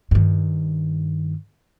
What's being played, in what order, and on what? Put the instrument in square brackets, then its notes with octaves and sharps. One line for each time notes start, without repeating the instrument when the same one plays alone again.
[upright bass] G2 D#3